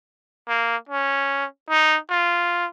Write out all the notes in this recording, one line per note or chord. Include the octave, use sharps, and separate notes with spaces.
A#3
C#4
D#4
F4